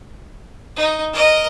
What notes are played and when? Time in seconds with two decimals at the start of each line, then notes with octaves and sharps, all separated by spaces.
0.76 D#4
1.13 A#4 D#5